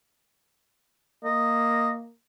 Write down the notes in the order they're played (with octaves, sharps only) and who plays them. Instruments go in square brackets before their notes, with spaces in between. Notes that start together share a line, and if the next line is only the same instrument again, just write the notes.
[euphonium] A#3 [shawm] D#5